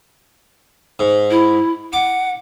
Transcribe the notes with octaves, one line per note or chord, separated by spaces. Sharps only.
G#2
E4
F#5 D6